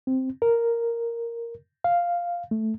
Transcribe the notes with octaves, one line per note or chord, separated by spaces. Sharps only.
C4
A#4
F5
A3